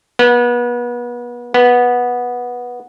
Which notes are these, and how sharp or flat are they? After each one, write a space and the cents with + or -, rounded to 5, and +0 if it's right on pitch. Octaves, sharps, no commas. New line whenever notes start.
B3 -30
B3 -10